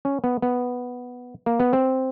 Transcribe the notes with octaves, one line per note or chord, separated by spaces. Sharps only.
C#4
B3
B3
A#3
B3
C4